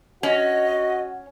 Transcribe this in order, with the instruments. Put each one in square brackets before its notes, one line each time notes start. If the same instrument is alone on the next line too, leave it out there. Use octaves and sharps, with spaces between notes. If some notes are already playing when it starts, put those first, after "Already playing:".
[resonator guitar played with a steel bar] C#4 [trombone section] F#4 [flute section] D#5